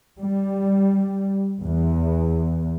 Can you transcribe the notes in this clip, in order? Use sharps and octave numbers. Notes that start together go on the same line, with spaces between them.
G3
E2